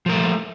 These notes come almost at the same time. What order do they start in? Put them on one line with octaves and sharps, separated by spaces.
F3 A#4 A3